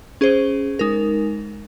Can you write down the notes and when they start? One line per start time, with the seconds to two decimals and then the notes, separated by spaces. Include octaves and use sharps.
0.21 C#4 G#4 C5
0.79 G#3 D#4 A#4